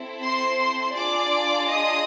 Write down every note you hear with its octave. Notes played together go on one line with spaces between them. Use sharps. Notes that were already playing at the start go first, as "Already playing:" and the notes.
Already playing: C4 E4 A4
C5 C6
D4 F4 G#4 D5 D6
D#5 D#6